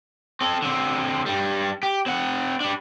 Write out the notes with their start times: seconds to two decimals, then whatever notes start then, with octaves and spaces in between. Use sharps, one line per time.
0.41 C4 A4
0.62 D3 C4
1.26 G2 G3
1.83 G4
2.06 C4 F#5
2.61 G3 D4